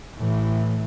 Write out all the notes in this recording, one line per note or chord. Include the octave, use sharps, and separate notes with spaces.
A2 E3